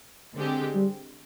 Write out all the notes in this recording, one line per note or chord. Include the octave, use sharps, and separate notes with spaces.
D3 G#3 C4 G4
G3